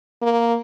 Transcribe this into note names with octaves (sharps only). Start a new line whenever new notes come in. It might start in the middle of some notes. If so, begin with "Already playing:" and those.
A#3